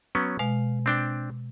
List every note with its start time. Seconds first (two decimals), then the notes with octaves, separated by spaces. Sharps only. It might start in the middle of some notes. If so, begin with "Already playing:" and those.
0.15 F#3 B3 C#4
0.39 B2 G#3 F5
0.86 C4 D4 G5